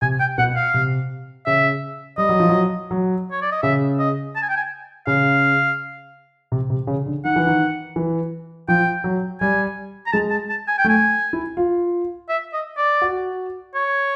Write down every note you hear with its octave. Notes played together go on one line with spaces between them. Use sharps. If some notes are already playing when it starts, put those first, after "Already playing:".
C3 G#5
G5
B2 F#5
F5
C3
C#3 E5
G3 D#5
F#3
F3
F#3
F#3
C#5
D5
D#5
C#3 E5
D#5
A5
G#5
G5
G#5
C#3 F5
C3
C3
C#3
D3
D#3 F#5
E3
D#3
E3
F3 G5
F#3
G3 G#5
A#5
G#3 A5
A5
A5
G#5
G5
A3
G#5
E4
F4
E5
D#5
D5
F#4
C#5